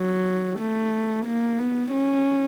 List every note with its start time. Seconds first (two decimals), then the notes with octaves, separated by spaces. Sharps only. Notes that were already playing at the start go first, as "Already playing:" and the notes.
Already playing: F#3
0.60 A3
1.26 A#3
1.59 B3
1.92 C#4